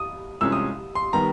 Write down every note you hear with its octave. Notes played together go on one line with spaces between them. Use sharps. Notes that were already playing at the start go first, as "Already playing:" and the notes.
Already playing: D#6
C2 C3 F3 G#3 C#4 E6
D#6
C6
D#3 G3 B3 A#5